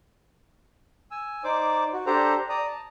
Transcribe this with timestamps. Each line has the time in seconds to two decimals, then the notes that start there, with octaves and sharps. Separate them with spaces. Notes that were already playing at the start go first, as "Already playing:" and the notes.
1.11 G#5 E6
1.44 D#4 C5 D5 D6
1.93 F#4
2.06 D4 G4 A4 C5 A#5
2.49 D5 A#5 D#6
2.67 A5